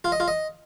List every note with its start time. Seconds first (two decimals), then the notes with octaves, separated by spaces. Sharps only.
0.04 F4
0.12 D#5
0.20 F4
0.28 D#5